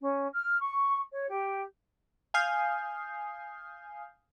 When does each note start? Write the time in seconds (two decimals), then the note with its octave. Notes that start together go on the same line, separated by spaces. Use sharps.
0.01 C#4
0.33 F6
0.60 C#6
1.13 C#5
1.29 G4
2.34 F5 G#5 D#6 F6 G6 C7